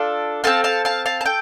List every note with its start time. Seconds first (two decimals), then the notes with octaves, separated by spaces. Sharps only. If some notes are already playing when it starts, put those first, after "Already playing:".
Already playing: D4 F4 A4
0.44 C4 F4 A4 F5 A5
0.64 F5 A5
0.85 F5 A5
1.06 F5 A5
1.21 A5
1.26 A4 G5